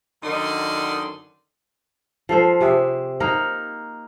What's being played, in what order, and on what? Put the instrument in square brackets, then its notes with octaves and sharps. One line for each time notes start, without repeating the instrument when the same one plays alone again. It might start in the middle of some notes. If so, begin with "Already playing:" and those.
[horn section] F#2 D3 D#3 D#4 D5 C6
[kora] F3 A4 C5
C3 G4 G#4 E5
A#3 D#4 A#4